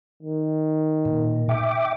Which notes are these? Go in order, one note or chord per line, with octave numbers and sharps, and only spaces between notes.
D#3
A#2
E5 G5 D6